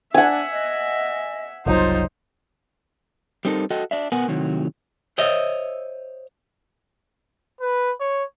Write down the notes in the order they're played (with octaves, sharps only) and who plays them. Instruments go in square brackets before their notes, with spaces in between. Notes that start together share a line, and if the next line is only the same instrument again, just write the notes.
[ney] D4 [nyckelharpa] E5 [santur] F#5 G#5
[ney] D#5
[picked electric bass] F#1 C2 F#3 [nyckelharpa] D#4 C5 [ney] F4
[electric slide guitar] G3 C4 D#4 A4 A#4
F#4 A4 D#5 G5
D4 D5 E5
B2 B3 A#4 F#5 G#5
A2 C3 D#3 F#3
[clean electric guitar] C5 C#5 D#5 E5
[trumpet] B4
C#5